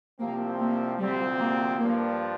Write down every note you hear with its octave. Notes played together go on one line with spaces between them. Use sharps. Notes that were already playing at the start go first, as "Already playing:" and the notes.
C2 C3 F3 A#3 C4
A#3
D2 C3 F3 G3 C4
A#3
G2 F3 A#3 D4